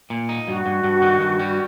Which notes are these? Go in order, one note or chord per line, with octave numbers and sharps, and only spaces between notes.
A#2
D#4
G2 F#4
G2
G2
D#3
G2
G3